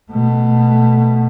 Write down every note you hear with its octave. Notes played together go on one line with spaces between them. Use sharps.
B2 A3